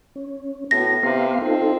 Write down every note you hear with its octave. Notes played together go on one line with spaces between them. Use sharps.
C#4
A2 B3 F#4 A#6
C3 B3 F5 C6
C4 D#4 F4 A4